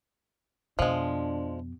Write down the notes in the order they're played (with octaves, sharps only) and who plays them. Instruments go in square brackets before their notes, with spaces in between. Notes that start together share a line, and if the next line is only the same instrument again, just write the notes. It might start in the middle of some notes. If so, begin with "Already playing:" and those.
[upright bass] F2 B2 [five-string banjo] F3 G#3 [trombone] D4